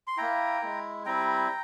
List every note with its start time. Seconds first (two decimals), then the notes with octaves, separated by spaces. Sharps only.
0.07 C6
0.17 A#3 E4 G5 A#5
0.62 G#3 E4
1.06 G3 C4 E4 G5 A#5